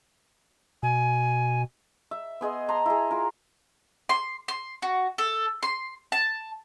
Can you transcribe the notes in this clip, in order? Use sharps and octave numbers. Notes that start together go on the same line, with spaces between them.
B2 G#5
E5
B3 G#4 D#5 C6
A5 A#5 C6
E4 G#4
F4 A#4
C6
C6
F#4
A4
C6
A5